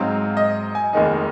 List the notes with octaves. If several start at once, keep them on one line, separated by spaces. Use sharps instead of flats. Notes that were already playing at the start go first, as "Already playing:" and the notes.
Already playing: G#2 F#3 C4 D#4 F5
D#5
G#5
F1 D#2 D#3 G#3 D#4